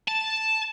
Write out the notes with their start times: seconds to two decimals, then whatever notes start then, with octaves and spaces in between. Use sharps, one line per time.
0.08 A5